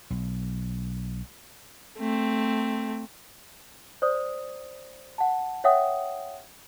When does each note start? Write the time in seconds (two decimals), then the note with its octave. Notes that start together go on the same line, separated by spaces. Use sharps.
0.10 B1
1.98 A3 C4
4.02 C5 D5 D#6
5.18 F#5 A5
5.64 C#5 E5 F#5 G5 D#6